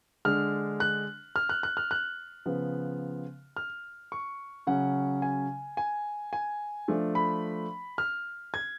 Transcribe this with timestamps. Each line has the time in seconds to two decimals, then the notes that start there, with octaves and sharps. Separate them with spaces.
0.25 D3 G#3 D4 F6
0.80 F#6
1.36 F6
1.49 F#6
1.63 F#6
1.77 F6
1.91 F#6
2.46 C#3 F3 B3
3.57 F6
4.12 C#6
4.67 C#3 F#3 C#4 F#5
5.22 G#5
5.77 G#5
6.33 G#5
6.88 F3 A3 D4
7.15 B5
7.98 F6
8.54 G#6